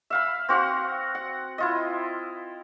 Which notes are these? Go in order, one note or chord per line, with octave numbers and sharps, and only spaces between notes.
E5 F5 B5
C4 F#4 F5 F#5
F#5
E4 F4 D#5